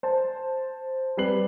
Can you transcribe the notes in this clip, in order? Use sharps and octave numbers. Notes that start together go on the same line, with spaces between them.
C5 A5
G3 C4 B4 C7 F#7